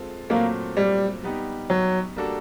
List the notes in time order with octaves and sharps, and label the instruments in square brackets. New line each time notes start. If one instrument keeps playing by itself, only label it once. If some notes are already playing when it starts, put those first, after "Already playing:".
Already playing: [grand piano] G#3 C4 F4 A4
[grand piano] A#2 F#3 A3 C4 [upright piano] A#3
[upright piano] G3
[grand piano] G3 B3 D#4 G4
[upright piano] F#3
[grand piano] G3 A#3 D4 F#4 A4